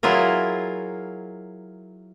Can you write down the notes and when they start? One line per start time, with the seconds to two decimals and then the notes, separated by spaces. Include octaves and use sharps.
0.03 F#3 E4 F4 G#4 A#4